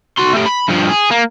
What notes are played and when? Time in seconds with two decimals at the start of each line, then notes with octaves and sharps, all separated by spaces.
0.18 F#4 C6
0.33 A3 G4
0.46 B5
0.68 G2 F3
0.89 G#4
1.11 A#3